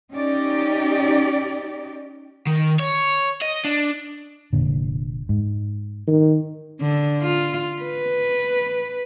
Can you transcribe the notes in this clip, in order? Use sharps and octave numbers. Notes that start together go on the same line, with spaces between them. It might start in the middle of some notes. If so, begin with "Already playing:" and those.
C#4 D#4 G4 D5
D#3
C#5
D#5
D4
F1 A#2 D3
G#2
D#3
D3
F4
B4